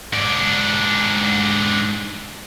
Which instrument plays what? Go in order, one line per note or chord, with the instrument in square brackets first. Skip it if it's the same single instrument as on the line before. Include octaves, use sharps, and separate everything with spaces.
[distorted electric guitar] G#2 D4